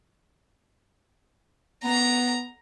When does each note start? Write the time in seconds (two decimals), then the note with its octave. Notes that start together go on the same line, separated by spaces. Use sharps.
1.84 B3 A#5